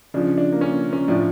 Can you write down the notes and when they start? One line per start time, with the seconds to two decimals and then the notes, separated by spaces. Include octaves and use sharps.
0.14 C#3 F3 D4
0.38 D4
0.52 A#3
0.61 C#4
0.93 C#4
1.08 A2 F3 D4